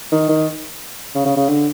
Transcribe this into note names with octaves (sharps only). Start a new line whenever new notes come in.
D#3
D#3
C#3
C#3
C#3
D3